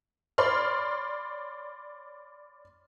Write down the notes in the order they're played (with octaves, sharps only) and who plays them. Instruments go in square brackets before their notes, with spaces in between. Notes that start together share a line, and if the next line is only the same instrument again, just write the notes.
[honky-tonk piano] C#5 D5 B5 C6 F6